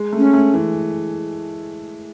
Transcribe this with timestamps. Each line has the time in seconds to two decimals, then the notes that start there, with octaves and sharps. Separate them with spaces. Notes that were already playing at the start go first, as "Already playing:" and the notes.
Already playing: G#3
0.13 A3
0.18 C#4
0.33 A3
0.54 E3